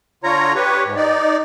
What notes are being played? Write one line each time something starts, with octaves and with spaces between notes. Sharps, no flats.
D3 F4 C#5 A#5
G4 B4 C#5
G#2
D#4 D5